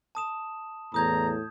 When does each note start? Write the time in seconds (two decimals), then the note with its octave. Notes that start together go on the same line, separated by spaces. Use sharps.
0.15 A5 D#6 E7
0.94 E2 A2 A#5 D#6 G6 G#6